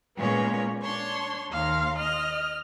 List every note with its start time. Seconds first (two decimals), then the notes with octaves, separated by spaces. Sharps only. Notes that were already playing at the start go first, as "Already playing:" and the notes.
0.17 A#2 G#3 B3 C#4 C#5
0.82 D4 C#5 C6 C#6
1.51 D#2 F5 A#5 C6
1.99 D#5 F6